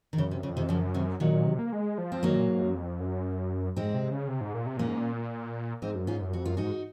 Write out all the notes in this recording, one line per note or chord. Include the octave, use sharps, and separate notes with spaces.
D#3
F#2 C#3
C3
F2 C#3
C3 D#3
F#2 C#3 F3
C3 D#3
A#2 D#3 F#3
A#2
C3
A#3
G#3
F3
C4
D#3 F#3 A#3
A#2
G#2
F#2
F2
F#2
G#2 G#3 C4
C3
C#3
C3
G#2
A#2
C3
A#2 A#3 C#4
G#2
A#2
G#2 C4 D#4
F#2
G#2 C#4 F4
F#2
F2 F#4
F#2 F4
G#2 D#4 F#4